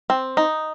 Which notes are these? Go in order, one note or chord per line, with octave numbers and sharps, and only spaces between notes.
C4
D#4